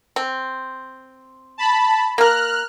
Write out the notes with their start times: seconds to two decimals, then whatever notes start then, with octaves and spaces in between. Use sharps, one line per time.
0.16 C4
1.58 A5 B5
2.18 A#3 A#4 F6 F#6